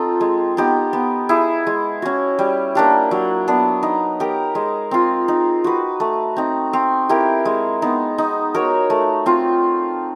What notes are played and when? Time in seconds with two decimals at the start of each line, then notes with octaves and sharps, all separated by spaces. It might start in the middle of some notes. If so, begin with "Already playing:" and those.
Already playing: C4 D#4 F4 A4
0.21 G#3
0.57 B3 D#4 G4
0.93 B3
1.29 E4 G#4
1.67 G#3
2.02 C#4 F#4
2.39 G3
2.75 A#3 D4 G4
3.11 F#3
3.48 B3 D4
3.83 D#4
4.20 G4 A#4
4.55 G#3
4.91 C4 F4
5.28 D#4
5.64 F#4 B4
6.00 A3
6.36 C4 D#4
6.73 C4
7.09 E4 G4 A#4
7.45 G#3
7.82 B3 D#4
8.18 D#4
8.54 F#4 A#4 C#5
8.90 A3
9.26 C4 F4